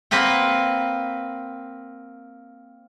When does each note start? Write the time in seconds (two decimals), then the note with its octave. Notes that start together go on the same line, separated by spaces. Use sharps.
0.11 A#3 C4 B4 F#5 G5